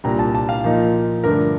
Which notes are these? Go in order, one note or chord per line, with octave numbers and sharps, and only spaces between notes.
C2 A#2 G3 D4 A#5
A5
A5
F5
A#2 F3 A#3 D#4
G2 D3 F3 A3 D4 A#4